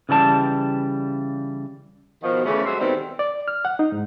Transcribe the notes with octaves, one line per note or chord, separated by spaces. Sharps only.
C#3 E3 G3 A5
B2 D#3 F3
C#3 E3 A3
F#3 G#3 C5 E5
B2 D#3 G3 A3 B3 C4
D5
F6
F#5
D#4
G#2